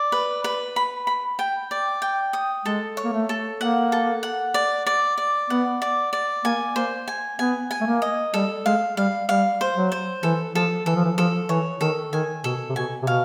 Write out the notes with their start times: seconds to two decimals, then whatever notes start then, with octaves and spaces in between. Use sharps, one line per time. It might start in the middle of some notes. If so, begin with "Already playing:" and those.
Already playing: D5
0.12 B4
0.44 B4
0.76 B5
1.07 B5
1.39 G5
1.71 D5
2.02 G5
2.33 D#6
2.65 G#3 A4
2.97 C#5
3.04 A#3
3.13 A3
3.29 A4
3.60 A#3 F#5
3.92 A4
4.23 F#5
4.54 D5
4.86 D5
5.18 D5
5.50 B3 F#5
5.82 D5
6.13 D5
6.45 A#3 G#5
6.76 A#3 C5
7.08 G#5
7.39 B3 G#5
7.71 G#5
7.81 A3
7.86 A#3
8.02 D#5
8.34 G3 A4
8.65 G#3 F5
8.97 G3 F5
9.28 G3 F5
9.61 C5
9.76 F#3
9.92 C5
10.23 E3 A4
10.55 F3 A4
10.86 E3 A4
10.96 F3
11.04 E3
11.18 F3 A4
11.49 E3 C#5
11.81 D#3 A4
12.13 D#3 G#5
12.44 B2 A4
12.69 C3
12.76 B2 G#5
13.02 C3
13.07 B2 F5